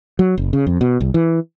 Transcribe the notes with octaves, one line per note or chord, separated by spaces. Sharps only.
F#3
F#1
C#3
F2
B2
C2
E3